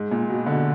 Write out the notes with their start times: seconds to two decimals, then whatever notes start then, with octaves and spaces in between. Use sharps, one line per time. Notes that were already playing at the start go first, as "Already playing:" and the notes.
Already playing: G#2
0.11 A#2
0.29 B2
0.46 D3